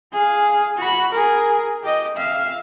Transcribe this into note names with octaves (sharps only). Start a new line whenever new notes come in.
G#4 F5
F#4 B5
G#4 A#4
G4 D#5
E5 F5